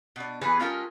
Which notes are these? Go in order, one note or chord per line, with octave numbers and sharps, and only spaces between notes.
B2 D4
E3 B3 G#4 B4
G#3 C#4 F4 G4 A4 A#4